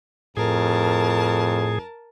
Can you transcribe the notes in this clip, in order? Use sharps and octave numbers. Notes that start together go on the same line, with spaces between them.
F2 A2 G#4 A#4 A5